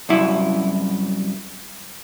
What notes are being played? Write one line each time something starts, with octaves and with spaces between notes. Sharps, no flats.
C2 F#2 E4